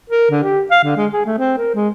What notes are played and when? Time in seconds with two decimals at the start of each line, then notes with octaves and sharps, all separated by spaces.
0.10 A#4
0.30 D3
0.43 G4
0.71 F5
0.84 D3
0.97 G#3
1.13 G#4
1.26 A3
1.38 C4
1.58 A#4
1.75 G#3